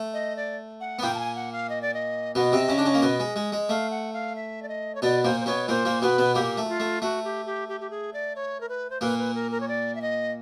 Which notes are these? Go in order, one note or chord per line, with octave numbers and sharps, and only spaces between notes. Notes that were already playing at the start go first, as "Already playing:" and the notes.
Already playing: A3
D#5
D5
F#5
B3
A#2 A#3 G5
A5
G#5
F#5
F5
D#5
D5
D#5
B2 B3 D#5
C3 C4
C#3 C#4
D4
C#3 C#4
A#3
B2 B3
G#3
G#3
G#3
A3 F5
F#5
F5
E5
D5
D#5
C#5
B2 B3 D5
A#2 A#3 C5
C5
B2 B3 C#5
A#2 A#3 C5
A#2 A#3
B2 B3 B4
B2 B3
A#2 A#3 G4
A3
F#4
F4
A3
A3 F#4
G4
G4
G4
G4
G#4
D5
C#5
A#4
B4
C5
A#2 A#3 B4
B4
A#4
A#4
C#5
D5
E5
D#5